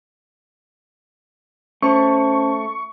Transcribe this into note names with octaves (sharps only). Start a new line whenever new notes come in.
A3 C#4 C5 A5 C#6